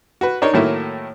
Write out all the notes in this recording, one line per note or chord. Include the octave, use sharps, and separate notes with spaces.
F#4 B4
D4 D#4 A#4 C#5
A2 D#3 F#3 A3 A#3 E4